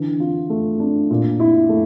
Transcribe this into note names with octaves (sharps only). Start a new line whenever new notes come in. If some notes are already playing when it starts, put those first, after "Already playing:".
Already playing: D3 E3
F4
A3
D4
A#2
E4
A3